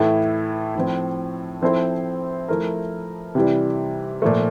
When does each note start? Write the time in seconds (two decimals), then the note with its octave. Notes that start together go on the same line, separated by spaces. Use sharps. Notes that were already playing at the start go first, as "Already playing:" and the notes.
Already playing: A2 E3 A3 E4 A4
0.75 A2 F3 C4
1.62 F3 C4 E4 A4 C5
2.48 F3 A3 E4 A#4
3.35 C3 E3 G3
4.22 A#2 F3 A3